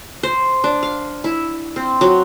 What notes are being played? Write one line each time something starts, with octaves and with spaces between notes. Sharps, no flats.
C5
D4
F5
E4
C4
F#3